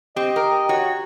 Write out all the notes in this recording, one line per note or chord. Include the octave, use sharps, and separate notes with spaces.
C4 G4 D#5
A#4 G5 A#5
F#4 C#5